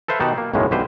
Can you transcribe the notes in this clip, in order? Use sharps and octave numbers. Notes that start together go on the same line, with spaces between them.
A4 B4 C5 E5 F5
B2 D#3 D#4 G4 F#5 A5
A#3
B1 F#2 A2 C#3 G#3
B1 D3 G4 B4 C5